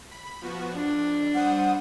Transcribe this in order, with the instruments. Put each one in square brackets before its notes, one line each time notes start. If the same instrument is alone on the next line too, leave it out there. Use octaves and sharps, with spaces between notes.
[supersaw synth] B5
F3 B3 F#4
[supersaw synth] F2 [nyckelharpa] D4
[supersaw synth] G3 C5 D#6 [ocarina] F#5